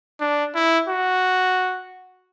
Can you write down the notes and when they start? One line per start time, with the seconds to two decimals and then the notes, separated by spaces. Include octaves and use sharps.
0.21 D4
0.55 E4
0.89 F#4